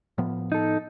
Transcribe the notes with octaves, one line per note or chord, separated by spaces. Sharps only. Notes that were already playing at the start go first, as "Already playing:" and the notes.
A2 F3 B3
D#4 A4